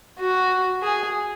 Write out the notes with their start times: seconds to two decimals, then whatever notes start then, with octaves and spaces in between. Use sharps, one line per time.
0.19 F#4
0.83 G#4